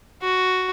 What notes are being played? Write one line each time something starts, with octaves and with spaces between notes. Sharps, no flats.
F#4